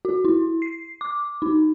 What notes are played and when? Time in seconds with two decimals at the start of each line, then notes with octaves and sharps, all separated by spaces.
0.05 F#4
0.25 E4
0.62 C7
1.01 D6
1.42 D#4